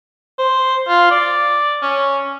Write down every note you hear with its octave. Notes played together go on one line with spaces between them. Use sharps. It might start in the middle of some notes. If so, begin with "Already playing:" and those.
C5
F4
D5
C#4